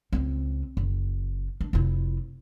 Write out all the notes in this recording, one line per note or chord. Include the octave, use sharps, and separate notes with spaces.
C#2 C4
F#1
D4
F1 E4